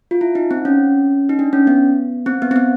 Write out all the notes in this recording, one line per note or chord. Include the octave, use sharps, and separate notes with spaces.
F4
E4
D#4
C4
C#4
D#4
D4
C#4
B3
C4
B3
C4
B3